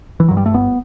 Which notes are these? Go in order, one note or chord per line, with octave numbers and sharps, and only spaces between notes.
E3
G2 F#3
G3
A3
G1 B3